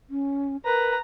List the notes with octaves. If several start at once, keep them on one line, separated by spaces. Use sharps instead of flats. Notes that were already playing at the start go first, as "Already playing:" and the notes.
C#4
A#4 B4 A#5